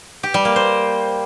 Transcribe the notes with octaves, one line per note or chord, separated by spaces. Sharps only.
G4
G3
A#3
C5